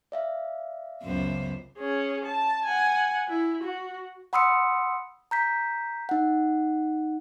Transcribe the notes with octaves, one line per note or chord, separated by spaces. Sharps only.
D5 E5 F5
C#2 F#2 B3 C5
C#4 G#4
A5
F#5 G#5
E4
F#4
F#5 B5 C6 D#6 E6 C#7
A#5 G6 B6
D#4 F#5